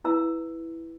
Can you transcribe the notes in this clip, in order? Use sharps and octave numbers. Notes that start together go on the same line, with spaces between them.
E4 B4 F5 A#5 E6